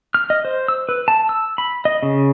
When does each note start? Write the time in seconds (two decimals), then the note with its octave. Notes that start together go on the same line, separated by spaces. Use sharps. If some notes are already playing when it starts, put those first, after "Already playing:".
0.14 F6
0.30 D#5
0.45 C5
0.68 E6
0.89 B4
1.08 A5
1.29 E6
1.58 B5
1.85 D#5
2.03 C#3